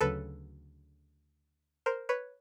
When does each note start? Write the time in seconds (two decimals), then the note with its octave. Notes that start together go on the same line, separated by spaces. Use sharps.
0.01 D2 C#3 F#3 A4 B4
1.86 A#4 C5
2.09 B4 C#5